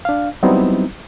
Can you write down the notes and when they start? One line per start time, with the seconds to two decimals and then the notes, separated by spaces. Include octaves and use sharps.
0.05 D4 F5
0.43 F#3 G3 B3 C4 D#4 E4